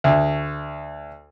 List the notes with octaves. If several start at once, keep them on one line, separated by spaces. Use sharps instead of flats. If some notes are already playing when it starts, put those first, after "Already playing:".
D2